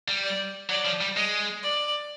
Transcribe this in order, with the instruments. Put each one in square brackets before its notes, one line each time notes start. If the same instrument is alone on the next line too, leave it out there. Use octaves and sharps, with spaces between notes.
[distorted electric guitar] G3
[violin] D5
[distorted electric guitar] F#3 [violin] D5
[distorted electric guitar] F3
G3
[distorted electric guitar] G#3 [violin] D#5
[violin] D5